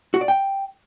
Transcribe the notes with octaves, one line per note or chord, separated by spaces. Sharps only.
F#4
D5
G5